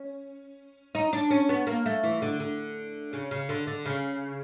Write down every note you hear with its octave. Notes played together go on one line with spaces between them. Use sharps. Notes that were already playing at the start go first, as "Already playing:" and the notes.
Already playing: C#4
D#4
D4
C#4
B3
A#3
A3
E3
D3
D3
C#3
C#3
D3
D3
C#3